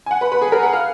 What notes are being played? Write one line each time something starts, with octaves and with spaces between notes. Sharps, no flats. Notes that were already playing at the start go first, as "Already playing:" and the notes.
G#5
F#5
B4 B5
B4 B5
G#4 G#5
A#4 A#5
F#5
F5 F6